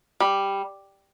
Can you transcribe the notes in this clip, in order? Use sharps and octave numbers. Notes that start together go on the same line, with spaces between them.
G3